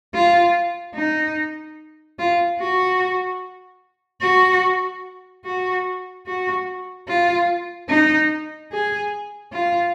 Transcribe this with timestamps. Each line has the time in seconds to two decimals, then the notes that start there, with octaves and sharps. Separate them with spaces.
0.14 F4
0.95 D#4
2.19 F4
2.60 F#4
4.22 F#4
5.45 F#4
6.27 F#4
7.08 F4
7.89 D#4
8.72 G#4
9.52 F4